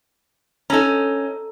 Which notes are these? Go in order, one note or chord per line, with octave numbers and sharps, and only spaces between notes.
C#4 D#4 A4 A#5